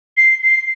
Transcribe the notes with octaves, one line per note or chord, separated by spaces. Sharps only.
C7
C7